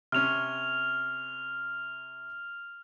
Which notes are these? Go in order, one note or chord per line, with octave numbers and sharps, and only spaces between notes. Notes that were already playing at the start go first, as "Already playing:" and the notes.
C3 C#4 F6 F7